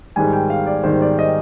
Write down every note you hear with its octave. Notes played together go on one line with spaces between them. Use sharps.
G#2 D#3 G3 G#5
G5
F5
D5
G#2 D#3 G3 C5
D5
D#5